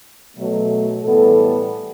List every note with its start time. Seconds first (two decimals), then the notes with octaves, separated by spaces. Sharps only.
0.37 B2 F#3 A3
1.03 A2 E3 G3 B3 A4